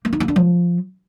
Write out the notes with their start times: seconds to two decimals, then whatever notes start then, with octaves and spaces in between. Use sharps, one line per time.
0.05 A#3
0.13 D#4
0.20 A#3
0.28 D4
0.36 F3